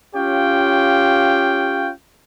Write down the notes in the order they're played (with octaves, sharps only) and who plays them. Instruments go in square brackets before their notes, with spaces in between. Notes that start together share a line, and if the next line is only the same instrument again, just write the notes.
[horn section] C#4 F4 G4 C#5 F5 G5